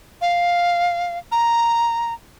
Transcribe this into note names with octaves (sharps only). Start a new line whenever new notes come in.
F5
A#5